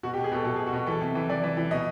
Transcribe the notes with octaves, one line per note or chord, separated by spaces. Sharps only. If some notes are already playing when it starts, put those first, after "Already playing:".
B2 F#4
G4
B2
G#4
B2 A4
B2 A4
G#4
B2
F#4
B2
E3 A4
C3
E3
E3 D5
E3
E3
B2 D#5